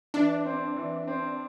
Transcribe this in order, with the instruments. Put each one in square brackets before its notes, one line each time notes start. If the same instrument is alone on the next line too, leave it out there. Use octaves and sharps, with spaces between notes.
[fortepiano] E3 [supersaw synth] D4
[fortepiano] C4
E3
C4